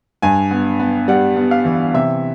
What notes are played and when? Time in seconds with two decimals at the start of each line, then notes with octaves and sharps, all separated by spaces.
0.22 G2 G#5
0.51 B3
0.80 B3
1.08 G3 F#5
1.36 B3
1.51 F5
1.65 E3
1.94 C3 E5